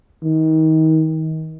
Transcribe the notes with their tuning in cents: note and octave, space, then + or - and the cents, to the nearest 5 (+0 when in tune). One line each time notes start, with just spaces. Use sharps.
D#3 +30